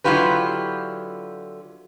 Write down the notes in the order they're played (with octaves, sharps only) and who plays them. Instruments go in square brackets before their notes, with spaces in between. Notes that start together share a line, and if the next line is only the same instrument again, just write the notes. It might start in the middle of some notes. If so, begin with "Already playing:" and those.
[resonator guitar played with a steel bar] D3 F#3 E4 F4 G4 B4